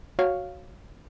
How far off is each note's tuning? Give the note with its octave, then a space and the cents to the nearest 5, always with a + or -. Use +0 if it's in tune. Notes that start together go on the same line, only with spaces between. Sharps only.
F#4 +0 C#5 +0 F5 +0